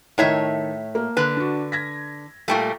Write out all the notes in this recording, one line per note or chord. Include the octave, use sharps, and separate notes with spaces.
A2 D#3 D#4 C#5 E5
A#3
D3 B4
D4 F#4
G#6 A#6 B6
A#2 G3 A3 A4 G5 C#6